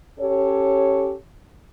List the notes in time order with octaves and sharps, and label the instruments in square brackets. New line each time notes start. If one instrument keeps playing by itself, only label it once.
[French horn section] C#4 G4 A4 C#5